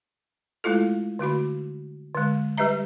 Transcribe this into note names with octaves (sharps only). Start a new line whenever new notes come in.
G#3 A3 E4 F4 A4
D3 A3 F#4 B5
D3 G#3
G3 G4 B4 D#5 E5 A#5